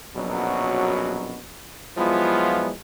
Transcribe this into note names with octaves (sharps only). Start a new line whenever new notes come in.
A#1 F#2 B2 F#3
F3 F#3 G#3 B3 E4 F4